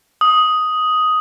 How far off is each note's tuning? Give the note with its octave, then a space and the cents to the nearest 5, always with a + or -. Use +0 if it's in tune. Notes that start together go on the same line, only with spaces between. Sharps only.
D#6 +5